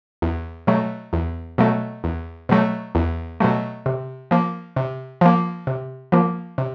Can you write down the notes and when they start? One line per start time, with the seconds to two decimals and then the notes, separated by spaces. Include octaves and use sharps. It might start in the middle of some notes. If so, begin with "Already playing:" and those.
0.22 E2
0.67 B2 F#3 A3
1.13 E2
1.58 B2 F#3 A3
2.04 E2
2.49 B2 F#3 A3
2.95 E2
3.40 B2 F#3 A3
3.86 C3
4.31 F3 A#3
4.76 C3
5.21 F3 A#3
5.67 C3
6.12 F3 A#3
6.58 C3